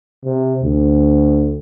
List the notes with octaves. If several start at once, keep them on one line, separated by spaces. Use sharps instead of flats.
C3
D2